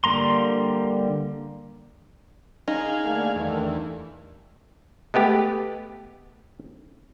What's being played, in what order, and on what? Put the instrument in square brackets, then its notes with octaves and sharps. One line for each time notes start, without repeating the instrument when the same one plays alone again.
[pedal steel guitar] D3 G3 A#3 A#5 C6
[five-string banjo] D#4 [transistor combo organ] G#4 F5
[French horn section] D3 A3 A#3
[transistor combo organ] E2 [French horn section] G2 D#3 A3
[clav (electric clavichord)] G#3 A3 B3 G4